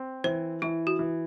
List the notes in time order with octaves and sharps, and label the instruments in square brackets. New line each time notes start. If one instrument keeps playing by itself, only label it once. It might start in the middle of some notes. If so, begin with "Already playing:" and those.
Already playing: [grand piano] C4
[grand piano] E3 [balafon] C5
[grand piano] E3 [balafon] E4
[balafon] F#4
[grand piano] E3